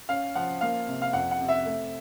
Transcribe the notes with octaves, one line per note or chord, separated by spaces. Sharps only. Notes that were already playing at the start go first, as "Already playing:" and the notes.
C#4 F5
F3 F#5
A#3 F5
C3
F5
F2 F#5
F#5
C3
E5
A3